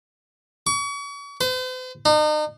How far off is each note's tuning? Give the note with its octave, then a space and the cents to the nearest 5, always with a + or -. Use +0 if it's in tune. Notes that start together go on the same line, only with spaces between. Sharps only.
C#6 +40
C5 -45
D#4 -40